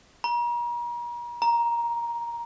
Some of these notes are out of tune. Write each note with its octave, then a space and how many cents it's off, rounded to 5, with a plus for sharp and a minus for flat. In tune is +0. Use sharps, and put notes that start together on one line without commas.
A#5 +40
A#5 +10